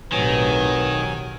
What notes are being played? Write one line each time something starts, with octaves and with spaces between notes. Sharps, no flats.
B1 A2 D#3 F#3 C4 G4 B4 G#5